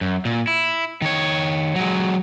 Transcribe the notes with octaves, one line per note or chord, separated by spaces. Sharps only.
F#2
A#2
E4
D#3 C#5
F#3 G#3